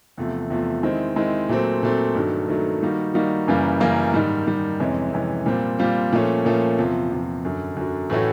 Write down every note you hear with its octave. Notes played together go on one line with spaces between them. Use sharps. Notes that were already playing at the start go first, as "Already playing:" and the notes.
E2 C3 F3 A3
E2 C3 F3 A3
D#3 G#3 C4 E4
D#3 G#3 C4 E4
A#2 F#3 A3 C4
A#2 F#3 A3 C4
G2 D#3 F#3 A3
G2 D#3 F#3 A3
D#3 G3 A#3 D#4 F#4
D#3 G3 A#3 D#4 F#4
F#2 C#3 E3 G3 A#3
F#2 C#3 E3 G3 A#3
G#2 D#3 G3
G#2 D#3 G3
F2 C3 E3 G#3 C#4
F2 C3 E3 G#3 C#4
A#2 G3 C4 F4
A#2 G3 C4 F4
A#2 F3 A3 C#4
A#2 F3 A3 C#4
E2 C3 F3
E2 C3 F3
F#2 D3 F#3
F#2 D3 F#3
A2 E3 A3 C#4 F#4